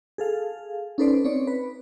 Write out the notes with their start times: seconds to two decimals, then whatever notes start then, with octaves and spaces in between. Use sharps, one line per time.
0.18 G#4 A4 F5
0.98 C#4 D#4 A4 B4 C5 D5
1.24 C4 D#4 C#5 D5
1.47 B4